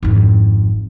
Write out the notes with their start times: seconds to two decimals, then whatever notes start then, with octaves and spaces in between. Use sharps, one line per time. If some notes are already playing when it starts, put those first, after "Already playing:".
0.03 G#1 F2